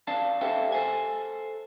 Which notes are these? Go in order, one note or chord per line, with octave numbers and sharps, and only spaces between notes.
C#4 D5 F5 A5
G4 A4 C5 E5 F5 G5
A4 C5 G#5